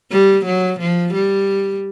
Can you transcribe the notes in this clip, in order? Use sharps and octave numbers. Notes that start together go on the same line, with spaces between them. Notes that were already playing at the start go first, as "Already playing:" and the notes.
G3
F#3
F3
G3